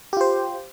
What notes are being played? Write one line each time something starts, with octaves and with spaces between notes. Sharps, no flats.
F4 G4 C5